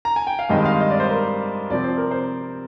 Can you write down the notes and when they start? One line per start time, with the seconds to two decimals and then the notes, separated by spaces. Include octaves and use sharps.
0.05 A#5
0.16 G#5
0.27 G5
0.39 F5
0.49 G2 D#3 G#3 C4 D#5
0.65 F5
0.80 D#5
0.90 D5
1.00 C5
1.10 A#4
1.70 C3 F3 C4 D5
1.84 C5
1.98 A#4
2.11 C5